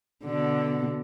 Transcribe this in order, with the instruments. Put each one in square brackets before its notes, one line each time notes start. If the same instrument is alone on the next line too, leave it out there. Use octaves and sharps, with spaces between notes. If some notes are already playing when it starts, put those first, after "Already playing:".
[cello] B2 D3